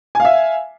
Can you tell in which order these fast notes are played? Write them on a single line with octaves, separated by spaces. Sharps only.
G#5 F5 E5